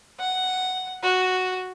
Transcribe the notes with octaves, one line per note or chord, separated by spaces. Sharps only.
F#5
F#4